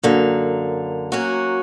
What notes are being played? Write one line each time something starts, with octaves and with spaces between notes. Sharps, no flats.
F#2 D3 A#3
F#3 A#3 C#4 F#4